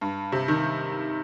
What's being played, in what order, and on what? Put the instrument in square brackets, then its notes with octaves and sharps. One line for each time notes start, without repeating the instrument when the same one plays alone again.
[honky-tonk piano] G2
C3
D#3